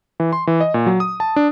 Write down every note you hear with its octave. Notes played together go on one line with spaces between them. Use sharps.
E3
C6
E3
D#5
A#2
F#3
D#6
A5
D4